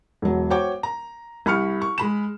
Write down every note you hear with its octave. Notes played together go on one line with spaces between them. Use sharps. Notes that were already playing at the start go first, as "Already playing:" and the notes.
E1 F#3
F#4 C5 C#5 G5 D6
A#5
C2 B5 C#6 F6 C#7
C#6
G#3 B5 E7